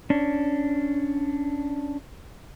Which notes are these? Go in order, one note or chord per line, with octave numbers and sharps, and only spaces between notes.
C#4 D4